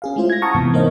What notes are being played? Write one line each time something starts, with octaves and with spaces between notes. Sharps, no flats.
C#4 G#4 F5
G#3 A3 E4 F4 C5
G#6 A#6
F#5 A5 A#5 C#6 D#6 F6
G#2 C3 E3 B3
A#3 D#4 C5 C#5 D#5 F5